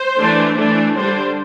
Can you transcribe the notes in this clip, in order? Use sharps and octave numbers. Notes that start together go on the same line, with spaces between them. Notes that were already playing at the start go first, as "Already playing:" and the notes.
Already playing: C5
E3 A3 D4
E3 A3 D4
D3 G3 D4 C5